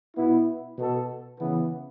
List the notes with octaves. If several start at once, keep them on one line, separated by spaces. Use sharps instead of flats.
B2 B3 E4
B2 B3 A4
C#3 E3 B3